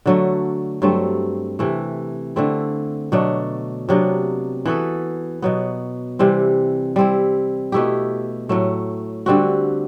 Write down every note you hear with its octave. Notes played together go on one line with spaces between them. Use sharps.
D3 F#3 A3
G2 F#3 A3 C4
C3 E3 A3
D3 A3 C4 E4
B2 F#3 A3 D4
C3 F#3 B3 D4
E3 B3 F#4 A4
B2 F#3 B3
C3 E3 G3 C4
G3 C4 E4
B2 A3 E4 G4
A2 F#3 A3
D3 G3 C4 F#4